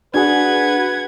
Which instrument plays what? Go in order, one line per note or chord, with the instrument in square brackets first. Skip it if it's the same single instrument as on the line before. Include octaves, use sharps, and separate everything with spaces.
[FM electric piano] D4 F#4 G#4 [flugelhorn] B4 [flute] F#5 [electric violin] G#6